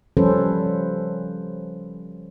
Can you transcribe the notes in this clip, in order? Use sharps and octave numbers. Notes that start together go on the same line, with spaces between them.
F3 G3 C#4 A4 B4 C5